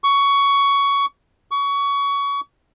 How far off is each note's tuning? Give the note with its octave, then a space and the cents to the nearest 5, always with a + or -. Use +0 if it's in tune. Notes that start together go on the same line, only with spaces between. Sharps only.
C#6 +15
C#6 +25